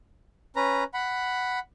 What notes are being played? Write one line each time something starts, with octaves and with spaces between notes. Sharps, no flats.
C#4 B4 A#5
F#5 B5